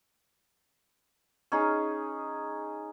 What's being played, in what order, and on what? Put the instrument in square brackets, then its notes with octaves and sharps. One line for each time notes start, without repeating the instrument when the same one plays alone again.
[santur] C#4 D#4 G#4